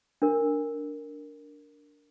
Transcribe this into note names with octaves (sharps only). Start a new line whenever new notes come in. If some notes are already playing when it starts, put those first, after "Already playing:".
D4 A#4